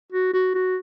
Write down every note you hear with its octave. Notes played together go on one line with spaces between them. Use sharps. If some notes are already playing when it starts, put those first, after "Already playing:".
F#4
F#4
F#4